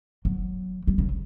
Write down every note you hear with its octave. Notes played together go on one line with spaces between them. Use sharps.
F#3
G3
C#3